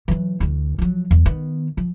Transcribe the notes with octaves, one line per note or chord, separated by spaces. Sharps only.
E3 F#3
D2 E4
F3 F#3
E2
D#3 B3
F3